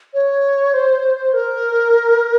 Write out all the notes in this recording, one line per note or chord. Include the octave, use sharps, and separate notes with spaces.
C#5
C5
A#4